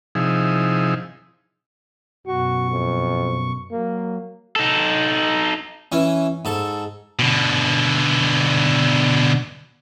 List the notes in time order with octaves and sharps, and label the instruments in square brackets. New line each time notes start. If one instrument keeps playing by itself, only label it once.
[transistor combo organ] C3 F3 D#4 E4 G#4
[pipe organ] F#2 B2 C#6 [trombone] F#4
[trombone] F2
[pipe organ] F#3 [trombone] A#3
[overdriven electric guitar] D#4 A4
[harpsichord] E3 C#4
G#2 A4
[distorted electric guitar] B2 D3